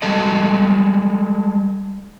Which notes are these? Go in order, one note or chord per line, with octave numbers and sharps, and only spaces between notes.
G3 G#3 A4 D#5